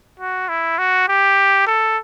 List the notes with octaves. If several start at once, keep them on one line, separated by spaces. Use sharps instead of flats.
F#4
E4
F#4
G4
A4